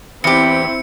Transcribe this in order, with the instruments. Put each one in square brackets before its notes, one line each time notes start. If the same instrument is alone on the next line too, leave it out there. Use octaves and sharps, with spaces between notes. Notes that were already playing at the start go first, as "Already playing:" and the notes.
[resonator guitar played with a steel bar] E2 G4 [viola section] C4 E4 [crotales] C#7